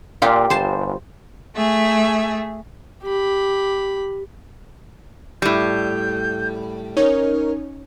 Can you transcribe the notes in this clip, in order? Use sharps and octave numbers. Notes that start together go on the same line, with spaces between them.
A#2 F4 G4
G1 C5 A5
A3 G#4 E5
G4 B5
A2 G3 G6
C#4 D#4 A#4 C#5